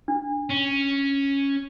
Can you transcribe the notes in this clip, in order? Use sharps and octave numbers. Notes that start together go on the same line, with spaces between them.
D4
C#4